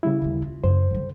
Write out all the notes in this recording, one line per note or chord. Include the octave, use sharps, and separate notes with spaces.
C#3 G3 E4
D#2 D3
F4
F#2 C#3 C5
D3 G3